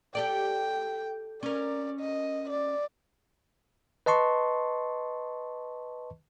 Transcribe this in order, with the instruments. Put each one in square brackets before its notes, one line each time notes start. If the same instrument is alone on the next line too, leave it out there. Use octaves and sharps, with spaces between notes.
[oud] G4 A4 D5 [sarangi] G5
[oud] C#4 A#4 [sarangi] D5
[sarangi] D#5
D5
[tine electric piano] B4 D#5 A5 C6 C#6